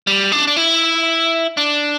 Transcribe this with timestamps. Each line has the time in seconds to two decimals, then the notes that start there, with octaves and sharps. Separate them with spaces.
0.07 G3
0.32 D4
0.47 D4
0.56 E4
1.57 D4